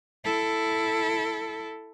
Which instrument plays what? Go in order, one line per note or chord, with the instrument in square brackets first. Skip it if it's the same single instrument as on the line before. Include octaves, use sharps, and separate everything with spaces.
[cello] E4 A4